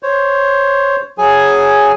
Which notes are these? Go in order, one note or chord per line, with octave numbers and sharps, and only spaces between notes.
C5 C#5
F#3 G#4 G#5